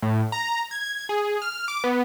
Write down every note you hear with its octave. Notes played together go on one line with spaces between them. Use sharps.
A2
A#5
G#6
G#4
F6
D6
B3